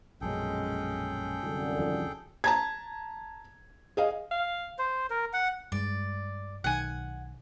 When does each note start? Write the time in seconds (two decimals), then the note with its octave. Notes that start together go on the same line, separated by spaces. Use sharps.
0.21 A#1 F#2 B2 G#3 C#4 G#4 A4 G5
1.41 C2 F#2 D3
1.78 D#2 F3
2.44 A5 A#5 G#6
3.97 G#4 D#5 F5
4.31 F5
4.79 C5
5.10 A#4
5.33 F#5
5.72 G2 G#3 D5
6.64 B1 D#3 F#5 G#5